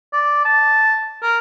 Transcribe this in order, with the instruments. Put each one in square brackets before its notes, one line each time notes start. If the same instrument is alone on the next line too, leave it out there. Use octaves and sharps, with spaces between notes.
[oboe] D5
A5
A#4